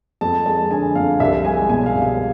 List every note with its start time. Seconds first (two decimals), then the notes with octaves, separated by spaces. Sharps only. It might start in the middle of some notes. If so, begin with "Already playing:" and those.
0.21 F2 A5
0.46 G#3 A5
0.71 D3 G#5
0.95 F2 F5
1.20 C2 E5
1.45 G#3 G#5
1.69 B2 G#5
1.86 F5
1.94 C2
2.02 F5